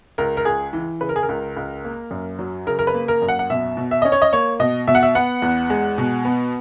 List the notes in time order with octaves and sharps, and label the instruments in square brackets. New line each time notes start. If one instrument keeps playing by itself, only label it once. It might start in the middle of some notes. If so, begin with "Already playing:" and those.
[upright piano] C#2 A#4
A#4
C#2 G#4
E3
C#3 B4
A#4
G#4
A#4
C#2
C#2
A#3
F#2
F#3
C#3 A#4
A#4
B4
A#3
A#4
F#2
F#5
F#5
B2 E5
B2
E5
C#4 D#5
C#5
D#5
A#3 C#5
B2 D#5
B2 E5
F#5
E5
B3 F#5
E2
G#3
B2
B3